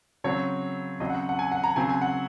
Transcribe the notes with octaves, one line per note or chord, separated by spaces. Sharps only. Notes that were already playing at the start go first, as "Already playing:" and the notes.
C#3 F#3 C4 C#5
C#3 F#3 C4 D#5
F#5
F#5
G#5
F#5
A#5
C#3 F#3 C4 G#5
G#5
F#5